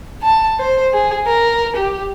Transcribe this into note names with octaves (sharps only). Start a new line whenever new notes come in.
A5
C5
G#4
A#4
G4